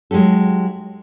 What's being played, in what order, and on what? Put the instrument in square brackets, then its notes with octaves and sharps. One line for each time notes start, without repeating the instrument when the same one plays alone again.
[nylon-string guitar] F#3 G#3 D#4 G4 A4